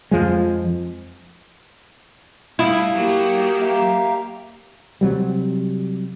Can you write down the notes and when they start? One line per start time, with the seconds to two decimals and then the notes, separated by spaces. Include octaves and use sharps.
0.11 F2 F3 G#3
2.59 G2 E4 F5 D#6
2.95 F#3 A#3 G4
3.62 E5 F5 A#5
5.01 C3 F#3 G3